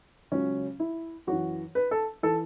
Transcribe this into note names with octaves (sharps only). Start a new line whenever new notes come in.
C#2 C#3 F#3 C#4
E4
F#2 E3 F#4
B4
A4
E3 A4